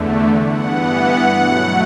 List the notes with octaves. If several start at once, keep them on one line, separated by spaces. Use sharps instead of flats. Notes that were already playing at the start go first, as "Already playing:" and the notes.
Already playing: E2 D3 A3
G2 E3 B3 F#5
B2 F#3 A3